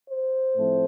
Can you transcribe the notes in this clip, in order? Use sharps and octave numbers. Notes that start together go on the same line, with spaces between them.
C5
A2 F3 A3 C4